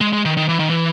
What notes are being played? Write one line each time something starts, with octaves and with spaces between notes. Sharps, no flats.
G#3
G#3
D#3
D#3
E3
D#3
E3